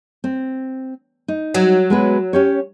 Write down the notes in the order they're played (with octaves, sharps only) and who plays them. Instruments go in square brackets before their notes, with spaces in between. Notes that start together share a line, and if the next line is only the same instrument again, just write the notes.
[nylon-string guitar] C4
D#4
[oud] F#3
[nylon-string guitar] G#3 B3 B4
C#4 G4 C#5